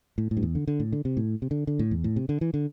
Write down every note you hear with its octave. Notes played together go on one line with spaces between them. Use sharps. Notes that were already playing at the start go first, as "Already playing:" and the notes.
A2
A2
G2
E2
D3
D3
A2
D3
C3
A2
C3
D3
D3
A2
E2
A2
C3
D3
E3
D3